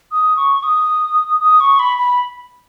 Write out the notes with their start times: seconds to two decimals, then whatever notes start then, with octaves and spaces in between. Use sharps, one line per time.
0.12 D#6
0.37 C#6
0.63 D#6
1.40 D#6
1.60 C#6
1.79 B5
1.98 B5